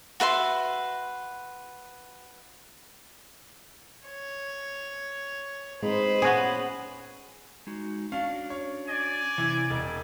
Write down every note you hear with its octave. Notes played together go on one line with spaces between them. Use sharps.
F#4 B4 E5 C6
C#5
G#3 C4 D#4 B4 C5
A#2 B3 C#4 F#4 G#4
G#3 D#4 F#4
C#4 D4 F#4 F5
C#5
D5 G#5
C3 E3
E1